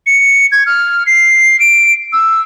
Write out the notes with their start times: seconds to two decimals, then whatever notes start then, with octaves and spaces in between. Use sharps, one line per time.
0.07 C#7
0.52 G#6
0.66 F6
1.07 C7
1.60 D7
2.13 E6